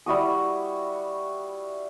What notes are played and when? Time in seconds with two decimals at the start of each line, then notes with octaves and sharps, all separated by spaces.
0.06 G3 E4 F#4 D#6